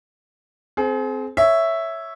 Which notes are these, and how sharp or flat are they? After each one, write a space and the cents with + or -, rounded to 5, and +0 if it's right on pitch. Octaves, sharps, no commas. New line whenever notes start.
C4 -10 G#4 +40
C#5 +0 E5 +0